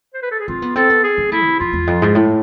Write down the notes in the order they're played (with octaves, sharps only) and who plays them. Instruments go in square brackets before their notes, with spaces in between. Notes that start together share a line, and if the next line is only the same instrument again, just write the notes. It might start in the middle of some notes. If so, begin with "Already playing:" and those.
[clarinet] C5
B4
A4
G#4
[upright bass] C4 [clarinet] F4
[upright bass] B3
[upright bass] C4 [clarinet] A4
[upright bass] B3
[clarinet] G#4
[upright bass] B3
[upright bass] A3 [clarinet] E4
[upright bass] C3
[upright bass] F2 [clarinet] F4
[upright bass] E2
F2
G#2
A2